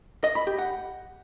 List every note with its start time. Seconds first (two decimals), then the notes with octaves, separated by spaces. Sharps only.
0.24 D#5
0.35 B5
0.47 G4
0.59 F#5